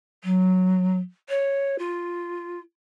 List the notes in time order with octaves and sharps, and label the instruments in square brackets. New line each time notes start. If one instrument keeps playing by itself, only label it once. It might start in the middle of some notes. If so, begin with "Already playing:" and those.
[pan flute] F#3
C#5
F4